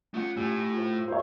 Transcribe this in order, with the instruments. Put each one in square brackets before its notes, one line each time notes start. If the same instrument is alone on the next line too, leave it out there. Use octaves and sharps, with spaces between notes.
[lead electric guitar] A3 F#5 [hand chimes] C#4 F4 D#6
[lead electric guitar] A2 [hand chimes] G4 G#5 E6
[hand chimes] F4 C5
E6
[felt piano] C5 C#5